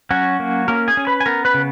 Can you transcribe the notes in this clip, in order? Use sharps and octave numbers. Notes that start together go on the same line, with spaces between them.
F#3 C#4 F#4
A#3
A#3 C#4 A#4
G#4 G#5
C#4
B4 B5
G#5
B3 A#4 A#5
B4 B5
C#3